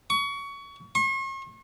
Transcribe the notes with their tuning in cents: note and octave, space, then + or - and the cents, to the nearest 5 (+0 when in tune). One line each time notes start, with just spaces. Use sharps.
C#6 +25
C#6 -45